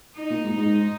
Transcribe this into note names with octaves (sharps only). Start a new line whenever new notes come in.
D#4
A#2
G#2
G#2 D#4